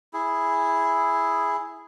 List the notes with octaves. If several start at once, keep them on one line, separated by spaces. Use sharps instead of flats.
E4 G#4